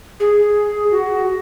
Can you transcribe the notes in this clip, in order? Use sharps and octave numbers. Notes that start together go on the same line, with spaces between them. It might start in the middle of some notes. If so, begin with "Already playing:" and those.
G#4
F#4